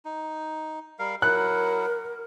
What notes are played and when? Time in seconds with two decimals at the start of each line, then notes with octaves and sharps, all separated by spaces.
0.05 D#4
0.99 G3 A#4 F5
1.22 F#3 E4 A#4 F#5 F#6